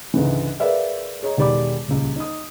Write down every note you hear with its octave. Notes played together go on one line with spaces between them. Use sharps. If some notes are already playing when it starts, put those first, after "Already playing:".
C#2 G#2 D3 E3
G#4 A#4 B4 D5 E5 F5
G#4 C#5 D#5 A#5
E1 D#3 G4 D5 B5 D6
D#1 C#2
D#4 D#6